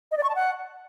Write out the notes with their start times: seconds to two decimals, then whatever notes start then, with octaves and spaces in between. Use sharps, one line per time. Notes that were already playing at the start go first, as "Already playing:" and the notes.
0.11 D#5
0.17 D5
0.23 C#6
0.29 A5
0.35 F#5